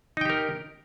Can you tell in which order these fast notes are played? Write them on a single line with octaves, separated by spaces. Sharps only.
D#4 G5 G4 A#4